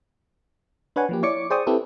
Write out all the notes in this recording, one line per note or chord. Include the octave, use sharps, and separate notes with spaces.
D4 B4 C#5 F#5 G#5
F3 A#3 G4
E4 C#5 D5 C#6 D6 C#7
G#4 C5 D5 G5 C#6 D#6
C4 E4 G4 A4 B4